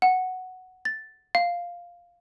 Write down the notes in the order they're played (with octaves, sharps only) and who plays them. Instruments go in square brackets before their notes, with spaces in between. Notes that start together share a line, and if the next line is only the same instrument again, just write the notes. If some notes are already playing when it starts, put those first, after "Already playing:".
[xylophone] F#5
A6
F5